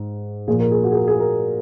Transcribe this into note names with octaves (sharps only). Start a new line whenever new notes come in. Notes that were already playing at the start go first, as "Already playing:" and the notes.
Already playing: G#2
A#2 F3 G#4
A#4
G#4
F#4
G#4
A#4
G#4
A#4